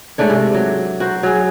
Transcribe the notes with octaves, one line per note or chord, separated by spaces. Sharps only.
G#2 A3 D4 C#5
C3
F#3
F#4 A#4 C5
F#3 G#4